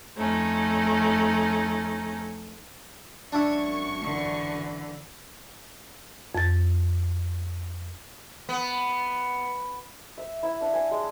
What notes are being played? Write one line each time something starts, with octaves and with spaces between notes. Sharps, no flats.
F2 A3 C#4 D#4
G#1 F#2 D4 E4 C#6
D3 E3
F2 A6
B3
E5
E4
D4
G#5
G#3